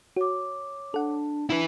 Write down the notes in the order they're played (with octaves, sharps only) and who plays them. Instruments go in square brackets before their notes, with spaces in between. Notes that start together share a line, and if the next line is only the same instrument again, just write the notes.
[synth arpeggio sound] F#4 [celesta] C#5 D6
[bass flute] D4 [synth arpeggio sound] A4 F#5
[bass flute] D4 [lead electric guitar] E4 B4